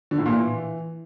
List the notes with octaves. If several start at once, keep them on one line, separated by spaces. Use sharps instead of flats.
D3
A2
A#2
E3